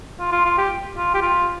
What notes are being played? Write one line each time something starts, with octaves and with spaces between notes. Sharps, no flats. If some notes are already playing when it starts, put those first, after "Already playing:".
F4
F4
F4
G4
F4
G4
F4